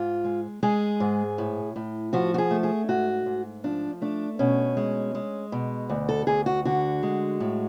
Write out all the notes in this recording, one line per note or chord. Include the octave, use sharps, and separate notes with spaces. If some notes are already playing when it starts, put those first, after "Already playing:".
Already playing: G#2 F4
G#3
G#3 G#4
G#2
A2
A2
F3 F#4
F#4
G#4
A3
G#4
G#2 F#4
G#2
F3 D4
A3 D4
B2 C#4
G#3
G#3
B2
D2
A4
D2 G#4
F#4
D3 F#4
G#3
A2